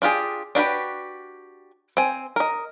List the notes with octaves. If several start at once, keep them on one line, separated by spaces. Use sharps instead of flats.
D4 F4 G4 G#4
D4 F#4 G4 B4
C4 G#5
A#4 D#5